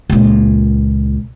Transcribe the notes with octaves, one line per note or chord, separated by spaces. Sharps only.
C#2 A#2